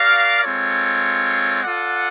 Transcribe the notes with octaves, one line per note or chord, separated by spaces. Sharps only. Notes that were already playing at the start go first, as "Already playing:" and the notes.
Already playing: F#4 A#4 D5 F5
G#3 C4 F4 A4 C#5
F4 A4 D5 F#5